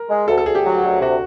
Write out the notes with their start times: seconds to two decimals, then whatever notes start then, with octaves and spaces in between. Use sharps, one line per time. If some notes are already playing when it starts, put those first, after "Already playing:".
Already playing: A#4
0.09 G#3
0.28 D2 A4
0.38 A4
0.46 D2 G#4
0.55 G4
0.65 F#3
0.83 D2
1.01 C3 F#4